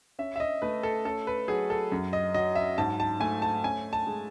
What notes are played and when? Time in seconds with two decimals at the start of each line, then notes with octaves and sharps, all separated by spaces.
0.19 C#4 E5
0.36 E5
0.40 D#5
0.62 A3 B4
0.83 A4
1.05 C#4 A4
1.27 B4
1.48 F#3 G#4
1.70 A4
1.92 F#2
2.13 D#5
2.34 F#3 D#5
2.55 E5
2.78 G#2 A5
3.00 A5
3.20 A3 G#5
3.42 A5
3.64 C#4 G#5
3.93 A5
4.07 G#3